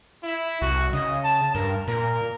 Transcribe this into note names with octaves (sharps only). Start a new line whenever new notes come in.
E4
C2 F#4
C#3 D#5
A5
G2 A#4
A#2 A#4